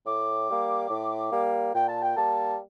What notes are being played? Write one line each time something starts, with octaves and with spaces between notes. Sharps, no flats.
A2 D6
G3 A#3
A2
G3 A#3
A#2 G5
A5
G5
G3 A#3 A5